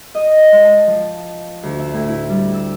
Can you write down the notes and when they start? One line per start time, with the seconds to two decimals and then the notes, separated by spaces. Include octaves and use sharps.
0.15 D#5
0.52 G#3
0.63 A5
0.87 F3
1.63 D2
1.79 E5
1.94 A2
2.08 E4
2.29 G3
2.54 E6